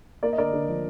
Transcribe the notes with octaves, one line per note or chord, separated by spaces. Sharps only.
A#3 A#4 D5
D#5
D3 A#4 D5
D3
F3